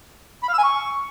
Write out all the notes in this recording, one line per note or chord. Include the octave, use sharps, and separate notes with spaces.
B5
F5
E6
G#5
C#6